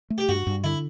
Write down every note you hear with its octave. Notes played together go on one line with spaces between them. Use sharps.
A3
G4
G2 F#4
G2
D3 E4